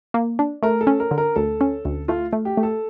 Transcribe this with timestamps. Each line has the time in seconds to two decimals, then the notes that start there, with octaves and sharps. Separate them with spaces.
0.14 A#3
0.39 D4
0.63 A3 A#4
0.81 A4
0.87 C#4
1.00 A#4
1.11 D3
1.18 A#4
1.36 D2 A4
1.61 C#4
1.85 D2
2.08 A3 F4
2.33 A3
2.45 G4
2.57 A3
2.63 A4